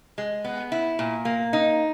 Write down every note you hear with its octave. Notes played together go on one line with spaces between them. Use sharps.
G#3
B3
E4
A#2
A#3
D#4